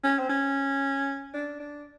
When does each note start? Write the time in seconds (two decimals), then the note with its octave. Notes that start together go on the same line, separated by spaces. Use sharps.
0.04 C#4
0.19 C4
0.29 C#4
1.34 D4
1.60 D4